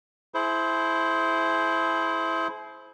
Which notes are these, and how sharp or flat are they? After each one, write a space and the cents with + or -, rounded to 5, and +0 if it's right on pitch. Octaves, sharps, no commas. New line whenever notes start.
E4 +0 G#4 +45 C5 +0